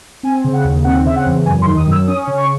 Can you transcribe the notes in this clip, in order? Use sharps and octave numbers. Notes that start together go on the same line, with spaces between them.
C4 G#5
C#3
F#5
D#2
C4 F#5
C#3 E5
F#5
E2
F#2 G#5
C6
D#3
D#6
F#2 E6
C#4 D#6
C#3
C#6